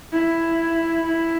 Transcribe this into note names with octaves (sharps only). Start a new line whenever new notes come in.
E4
E4